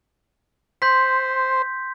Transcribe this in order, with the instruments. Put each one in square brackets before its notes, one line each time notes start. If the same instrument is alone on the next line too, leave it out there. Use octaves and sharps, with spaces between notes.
[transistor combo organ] C5 [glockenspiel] C6 G6 B6